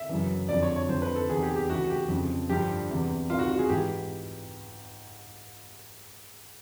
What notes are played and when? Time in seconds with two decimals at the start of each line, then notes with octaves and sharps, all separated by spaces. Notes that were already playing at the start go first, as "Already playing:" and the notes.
Already playing: E5
0.09 F#2 C#3 E3
0.49 F2 D3 F3 D5
0.63 C#5
0.76 C#5
0.89 F2 D3 F3 C5
1.02 B4
1.16 A4
1.29 E2 C3 D#3 G#4
1.43 G4
1.56 G4
1.69 D2 C#3 E3 F#4
1.90 G4
2.09 F2 C#3 F3
2.49 G2 D3 F3 G4
2.89 E2 C3 E3
3.30 C2 C3 D#3 F4
3.39 F#4
3.49 F#4
3.59 G#4
3.69 G#2 E3 G4